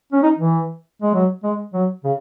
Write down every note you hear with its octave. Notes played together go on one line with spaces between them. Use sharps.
C#4
D#4
E3
G#3
F#3
G#3
F#3
C#3